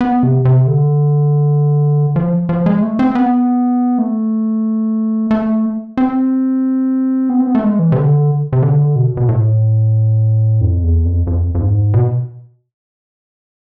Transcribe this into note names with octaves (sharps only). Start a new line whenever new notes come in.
B3
C3
C3
D3
F3
F3
G#3
A3
C4
B3
A3
A3
C4
B3
C4
B3
A3
G#3
E3
C3
D3
C3
D3
B2
B2
A2
F2
E2
F2
F2
F2
G#2
B2